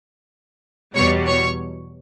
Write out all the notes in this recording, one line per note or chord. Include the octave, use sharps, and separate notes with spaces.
E2 B2 G3 C#5 C#6
C#5 C#6